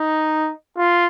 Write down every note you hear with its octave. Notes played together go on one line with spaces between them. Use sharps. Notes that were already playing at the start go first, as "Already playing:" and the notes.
Already playing: D#4
F4